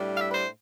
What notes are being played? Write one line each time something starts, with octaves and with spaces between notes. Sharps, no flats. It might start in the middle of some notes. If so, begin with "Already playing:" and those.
Already playing: A2 G3 D4
F5
E5
B4
C5